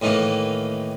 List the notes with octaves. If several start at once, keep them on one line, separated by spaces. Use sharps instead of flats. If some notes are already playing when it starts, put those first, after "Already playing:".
A2 D#3 E3 A3 A#3